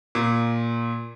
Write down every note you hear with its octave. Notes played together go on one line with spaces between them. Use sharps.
A#2